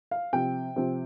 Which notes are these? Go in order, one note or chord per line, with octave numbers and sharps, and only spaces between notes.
F5
C3 F3 C4 G5
C3 F3 C4